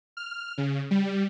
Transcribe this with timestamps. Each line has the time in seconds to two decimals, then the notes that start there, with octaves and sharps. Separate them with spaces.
0.17 F6
0.58 C#3
0.91 G3